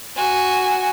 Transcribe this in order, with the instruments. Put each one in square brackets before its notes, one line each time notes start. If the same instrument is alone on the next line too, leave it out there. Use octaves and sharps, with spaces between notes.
[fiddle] F#4 G#5